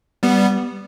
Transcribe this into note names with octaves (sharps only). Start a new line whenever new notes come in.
G3 B3